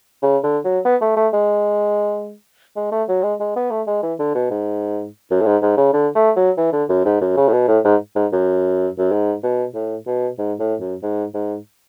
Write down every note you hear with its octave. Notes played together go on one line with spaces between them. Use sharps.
C#3
D3
F#3
B3
A3
A3
G#3
G#3
A3
F#3
G#3
G#3
B3
A3
G#3
E3
D3
B2
G#2
F#2
A2
G#2
G#2
C#3
D3
A3
F#3
E3
D3
F#2
G#2
F#2
C#3
A2
B2
A2
G#2
G#2
F#2
F#2
G#2
B2
A2
B2
G#2
A2
F#2
G#2
G#2